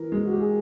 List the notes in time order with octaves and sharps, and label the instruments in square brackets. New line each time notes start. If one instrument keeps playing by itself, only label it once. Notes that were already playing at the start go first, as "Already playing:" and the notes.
Already playing: [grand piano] E3 [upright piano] A#4
[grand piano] G#3
[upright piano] F#4
G4
G#4